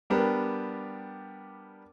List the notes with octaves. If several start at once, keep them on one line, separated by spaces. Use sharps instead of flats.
G3 B3 D4 G4 A#4